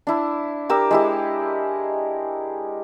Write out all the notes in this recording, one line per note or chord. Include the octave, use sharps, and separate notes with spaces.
D4 E4
G4 A#4 D6 E6
G#3 E4 G4